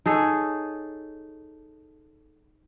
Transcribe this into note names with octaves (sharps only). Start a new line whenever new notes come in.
D#4 G#4 A4 C#5